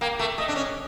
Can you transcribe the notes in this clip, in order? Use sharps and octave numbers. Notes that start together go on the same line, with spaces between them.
A#3 G5
A3
A3 D#5
D4
C#4